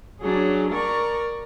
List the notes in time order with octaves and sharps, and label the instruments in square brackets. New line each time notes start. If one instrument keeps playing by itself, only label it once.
[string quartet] F#3 C#4 D4 G#4
A#4 D5 A#5 C#6